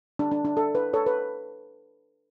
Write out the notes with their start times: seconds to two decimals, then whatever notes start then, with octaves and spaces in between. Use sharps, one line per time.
0.19 D4
0.31 D4
0.45 D4
0.57 A4
0.75 B4
0.93 A4 C#5
1.06 B4